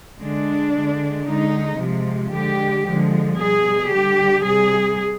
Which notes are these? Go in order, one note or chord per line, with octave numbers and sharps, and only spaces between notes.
D3 G#3 D4
D3 G#3
D3 G#3 D#4
C3 F3 G#3
D3 G#3 G4
D3 F3 G#3
B2 G3 G#4
D3 G3 G4
C3 G3 G#4